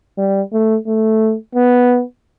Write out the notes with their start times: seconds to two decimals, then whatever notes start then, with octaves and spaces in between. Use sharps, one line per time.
0.18 G3
0.52 A3
0.87 A3
1.55 B3